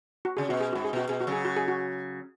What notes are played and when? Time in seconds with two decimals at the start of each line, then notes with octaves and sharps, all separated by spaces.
0.25 F#4
0.37 C#3 G#4
0.49 B2 F#4
0.61 G#4
0.73 G#2 F#4
0.84 G#4
0.93 B2 F#4
1.09 B2 G#4
1.20 F#4
1.27 C#3 F#3
1.33 G#4
1.45 F#4
1.57 G#4
1.68 F#4